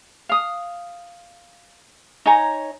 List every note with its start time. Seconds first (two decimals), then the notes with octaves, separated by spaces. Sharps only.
0.29 F5 D#6
2.26 D#4 C#5 G#5 A#5